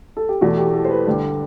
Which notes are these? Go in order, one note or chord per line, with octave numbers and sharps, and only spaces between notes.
A4
G4
E2 B2 A3 F#4
G4
A4
C5
B4
G2 D3 G3